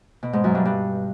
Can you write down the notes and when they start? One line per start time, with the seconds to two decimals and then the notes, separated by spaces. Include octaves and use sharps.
0.23 B2
0.33 G#2
0.44 F#2
0.55 G2
0.65 G2